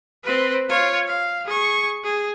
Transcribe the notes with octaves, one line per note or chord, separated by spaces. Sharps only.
C4 B4
F4 C#5
F5
G#4 C#6
G#4